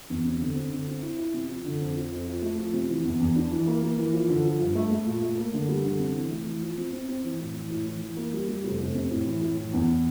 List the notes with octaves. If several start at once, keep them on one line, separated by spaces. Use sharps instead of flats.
E2
C3
D3
C4
D3
C4
E4
E4
C3
F3
D3
F2
F3
F2
F3
A3
F3
C3
E3
E2
E2
D4
E3
A#3
A#3
E3
F3
D3
F3
G2
A3
A3
A#2
A3
A#3
D3
G3
D3
C3
E3
A3
E3
F3
C4
C4
C4
E3
A2
E3
A2
E3
E3
A#3
G3
G3
F1
F1
C3
A2
E3
A2
E3
E2